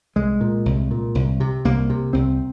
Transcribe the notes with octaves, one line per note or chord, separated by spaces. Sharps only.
C2 G#3
A#2
C2
A#2
C2
C3
C2 A#3
C3
C2 C4